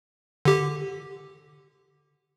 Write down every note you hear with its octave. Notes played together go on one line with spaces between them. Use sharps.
D3 G4